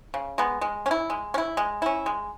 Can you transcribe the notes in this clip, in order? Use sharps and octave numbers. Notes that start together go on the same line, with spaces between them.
C#3
G#3 B3
G#3
C#4
E4
G#3
C#4
E4
G#3
C#4 E4
G#3